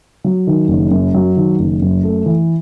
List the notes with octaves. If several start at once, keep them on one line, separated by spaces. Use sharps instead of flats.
F#3
D#3
F#1
F#2
F#3
D#3
F#1
F#2
A3
E3